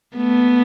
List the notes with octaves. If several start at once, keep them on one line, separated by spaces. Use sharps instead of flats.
A3 B3